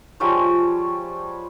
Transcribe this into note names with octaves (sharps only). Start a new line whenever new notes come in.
F3 G3 G#3 C#5